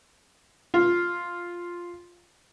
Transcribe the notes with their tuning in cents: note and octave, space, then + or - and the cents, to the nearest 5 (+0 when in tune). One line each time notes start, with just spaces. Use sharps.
F4 +0